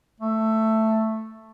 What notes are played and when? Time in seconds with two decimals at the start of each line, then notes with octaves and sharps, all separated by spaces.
0.20 A3